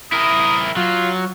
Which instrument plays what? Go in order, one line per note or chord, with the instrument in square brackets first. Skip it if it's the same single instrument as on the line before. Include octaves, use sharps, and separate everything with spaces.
[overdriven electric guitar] E4 A#4 [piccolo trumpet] D#6
[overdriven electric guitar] F#3 [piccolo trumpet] F4